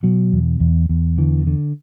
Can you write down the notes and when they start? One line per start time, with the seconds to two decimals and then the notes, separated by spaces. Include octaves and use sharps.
0.03 B2 F#3
0.33 E2
0.60 E2
0.89 E2
1.18 D3 E3
1.47 D3